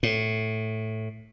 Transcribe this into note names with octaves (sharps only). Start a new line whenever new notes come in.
A2